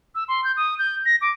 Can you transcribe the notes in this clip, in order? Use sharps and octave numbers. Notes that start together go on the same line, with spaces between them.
E6
C6
G6
D#6
G6
A#6
D6